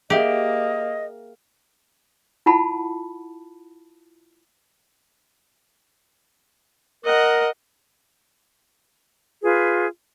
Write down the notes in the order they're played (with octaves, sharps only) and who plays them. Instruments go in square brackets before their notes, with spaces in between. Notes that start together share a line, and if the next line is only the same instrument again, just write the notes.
[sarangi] A#3 [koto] G4 [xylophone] G#4 E5 [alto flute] D#5
[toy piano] E4 F4 F#5 A5 B5
[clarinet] A#4 [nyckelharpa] D#5 F#5
[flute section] F4 G#4 B4